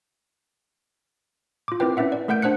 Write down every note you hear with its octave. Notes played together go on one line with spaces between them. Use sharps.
F4 D6
C4 E4 F4 A#4 B4 G5
C#4 E4 B4 E5 F#5
D5
A3 A#4 F#5 G6 D7
D4 C5 F#5 F#6 C#7